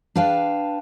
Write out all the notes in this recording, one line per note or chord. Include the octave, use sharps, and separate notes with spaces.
D4 B4 F5 G5 A5